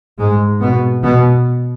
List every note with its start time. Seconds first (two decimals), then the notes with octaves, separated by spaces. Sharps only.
0.19 G#2 G#3
0.62 B2 B3
1.04 B2 B3